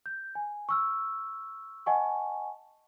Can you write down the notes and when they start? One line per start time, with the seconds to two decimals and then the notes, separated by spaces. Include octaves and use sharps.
0.06 G6
0.35 G#5
0.69 C#6 E6 F6
1.86 D#5 F#5 G#5 A5 C#6